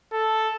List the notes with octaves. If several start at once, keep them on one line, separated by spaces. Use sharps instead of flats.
A4